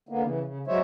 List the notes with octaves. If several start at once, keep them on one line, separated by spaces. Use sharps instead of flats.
D3 A#3 B3
C#3 E3
C#3
F#3 G#3 C5 C#5 E5